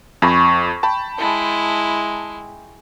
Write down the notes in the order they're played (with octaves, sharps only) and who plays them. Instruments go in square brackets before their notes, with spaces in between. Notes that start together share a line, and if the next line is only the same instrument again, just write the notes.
[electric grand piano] F2 A#6 [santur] G#5 B5 C#6
[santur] G5 [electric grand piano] A5 B5
[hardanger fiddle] G#3 E4